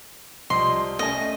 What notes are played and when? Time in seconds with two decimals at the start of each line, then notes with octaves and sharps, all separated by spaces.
0.50 C2 F3 D#5 C6
0.99 A3 C#4 D#5 G#5